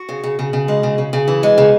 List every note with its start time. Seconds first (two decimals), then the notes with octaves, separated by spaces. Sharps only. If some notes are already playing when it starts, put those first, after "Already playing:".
Already playing: F#4
0.09 C#3
0.24 C#3
0.39 C#3
0.53 C#3
0.68 G#3
0.83 C#3
0.98 C#3
1.13 C#3
1.28 E3
1.43 G#3
1.58 C#3